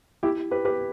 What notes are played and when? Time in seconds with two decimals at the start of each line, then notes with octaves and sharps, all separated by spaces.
0.23 E4 G4
0.51 G4 B4
0.65 G4 B4